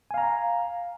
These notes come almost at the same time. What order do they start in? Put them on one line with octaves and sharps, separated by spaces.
G#5 F5 A#5